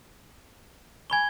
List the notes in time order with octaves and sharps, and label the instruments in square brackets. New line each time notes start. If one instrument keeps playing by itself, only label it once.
[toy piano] G#5 B5 C#6 [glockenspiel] G#6 G7